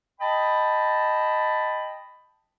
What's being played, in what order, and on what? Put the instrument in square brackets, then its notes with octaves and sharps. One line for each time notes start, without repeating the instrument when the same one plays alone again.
[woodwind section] D#5 G5 A5 B5